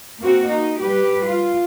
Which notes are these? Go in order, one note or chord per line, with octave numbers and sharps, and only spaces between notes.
A#3 C4 F#4
D#4
G3 G4 B4
F4